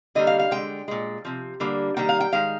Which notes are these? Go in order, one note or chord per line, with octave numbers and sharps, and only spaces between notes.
D3 G3 A#3 D#5
F5
F5
D3 G#3 G5
A#2 G#3
C3 F3
D3 G3 A#3
D#3 G3 A#3 G5
F5
G5
D#3 G#3 F5